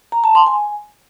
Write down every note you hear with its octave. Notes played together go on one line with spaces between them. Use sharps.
A#5
A5
C6
G#5